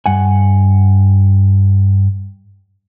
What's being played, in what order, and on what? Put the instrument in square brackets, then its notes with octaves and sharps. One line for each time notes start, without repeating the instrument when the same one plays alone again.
[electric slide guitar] G2 F#5 G#5